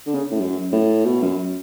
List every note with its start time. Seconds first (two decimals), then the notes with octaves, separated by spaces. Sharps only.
0.07 D3
0.14 C#3
0.31 A2
0.40 F#2
0.72 A2
1.05 B2
1.22 F#2